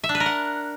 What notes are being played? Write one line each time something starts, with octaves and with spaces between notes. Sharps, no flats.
E5
D4
B4
A#4
F#5